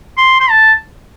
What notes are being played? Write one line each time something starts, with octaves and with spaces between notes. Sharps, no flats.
C6
C6
A5